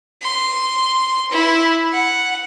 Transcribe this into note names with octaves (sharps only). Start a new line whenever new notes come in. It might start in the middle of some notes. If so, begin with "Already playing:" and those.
C6
E4
F#5